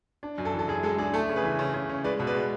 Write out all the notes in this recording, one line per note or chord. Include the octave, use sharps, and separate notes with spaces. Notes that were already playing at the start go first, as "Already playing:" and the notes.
D4
F#2
A4
E3
A4
F#2 G#4
G#3 A4
D4 G#4
A3 A4
C#3
G#4 B4
E3
C#3
C#3
C#4
G#3 B4 D5
B2
B4 D5
G#3